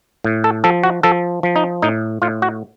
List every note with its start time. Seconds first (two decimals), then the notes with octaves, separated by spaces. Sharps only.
0.24 A2
0.44 A4
0.64 F3 A4
0.84 F#4
1.03 F3 A4
1.43 F3
1.56 D#4
1.82 A2 D#4
2.22 A2 F4
2.42 F#4